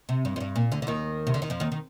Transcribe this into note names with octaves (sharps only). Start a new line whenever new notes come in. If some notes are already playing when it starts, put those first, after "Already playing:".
C3
G2
F2
G2
A#2
D2 D3
D3
D#2 D#3
C3
D3
D#3
F2 F3
D#2 D#3
D#3